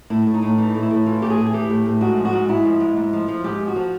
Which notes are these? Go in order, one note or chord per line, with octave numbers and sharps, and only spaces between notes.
A2 E4
A2
D#4
A2
E3 D#4
A2
E4
A2
E3 F4
A2 G4
G#4
A2
G#4
E3 G4
A2
A2
G#2 F#4
F3
F#4
G#2
G#2 E4
F3
G#2
G#2
F3
F3
G#2 G4
F3
F#4
F3